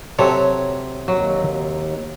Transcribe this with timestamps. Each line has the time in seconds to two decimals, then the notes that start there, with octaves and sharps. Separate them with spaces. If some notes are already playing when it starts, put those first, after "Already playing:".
0.19 C3 F#3 A4 C#5
1.08 D#2 F#3